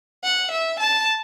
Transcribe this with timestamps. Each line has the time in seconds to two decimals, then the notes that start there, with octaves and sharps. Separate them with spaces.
0.23 F#5
0.51 E5
0.80 A5